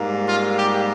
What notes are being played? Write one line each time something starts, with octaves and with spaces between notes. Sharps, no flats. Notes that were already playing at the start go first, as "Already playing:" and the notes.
Already playing: G#2 G3 A#3
F4
G4